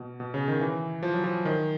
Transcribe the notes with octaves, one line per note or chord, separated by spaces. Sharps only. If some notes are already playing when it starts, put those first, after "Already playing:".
Already playing: B2
B2
C#3
D#3
E3
F3
F#3
F3
D#3